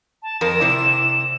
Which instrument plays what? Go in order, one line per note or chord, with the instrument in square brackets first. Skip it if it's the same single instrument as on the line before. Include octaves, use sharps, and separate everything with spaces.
[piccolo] A5
[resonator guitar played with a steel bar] F2 A#4 [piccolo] E7
[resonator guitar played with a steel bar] C3 E4 D5